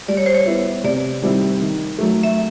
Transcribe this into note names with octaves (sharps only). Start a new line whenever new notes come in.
G3 D5
C#5
C5
C#5
B3 E4
C3 D5
D#3 G3 C4 E4
D#3
F#3 A3
E5